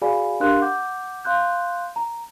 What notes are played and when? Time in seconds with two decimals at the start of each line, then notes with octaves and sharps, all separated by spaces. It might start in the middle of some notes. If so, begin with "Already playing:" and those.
0.02 F#4 G#4 D5 F5 G#5 B5
0.40 D4 G4 A#4 F5 C6 F#6
0.61 F#5 D6 G6
1.25 F5 C6 F#6 G6
1.96 A#5